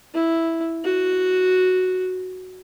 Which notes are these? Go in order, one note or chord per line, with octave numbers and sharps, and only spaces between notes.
E4
F#4